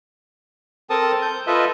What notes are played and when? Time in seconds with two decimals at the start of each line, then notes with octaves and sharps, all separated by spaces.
0.90 C4 A4 A#4 A5 D#6
1.22 G6
1.47 F4 A4 B4 D#5 E5